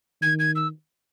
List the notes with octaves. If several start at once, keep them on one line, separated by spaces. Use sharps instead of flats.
D#3 G#6
G#6
E6